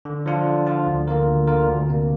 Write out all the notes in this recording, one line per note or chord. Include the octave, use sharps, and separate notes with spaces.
D3
F3 D4 F4
D3
F3 D4 F4
D2
D3 A#3 F4 A#4
D2
D3 A#3 F4 A#4
D2
C3 A#3